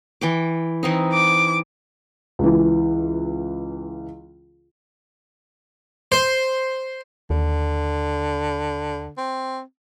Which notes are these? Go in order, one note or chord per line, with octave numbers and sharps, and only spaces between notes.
E3 G5 D6
E3 C4 D#4
D6
C#2 E3
C5
D#2 D3
C4